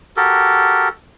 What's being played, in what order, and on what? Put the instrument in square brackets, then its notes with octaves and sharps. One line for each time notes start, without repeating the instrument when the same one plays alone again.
[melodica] F#4 G4 A4 A#4